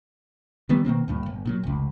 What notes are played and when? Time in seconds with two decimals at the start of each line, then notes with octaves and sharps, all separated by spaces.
0.69 D#3 E3 G3 B3
0.85 B2 D#3 A#3 C4
1.08 D2 G2 A#2
1.26 G1
1.45 A#2 C#3 F#3
1.63 F1 C#2